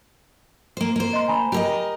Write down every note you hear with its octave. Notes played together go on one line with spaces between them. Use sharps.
A#3 C5
A#3 C5
D#5 C6
G#5 A#5 B5
G4 A#4 D#5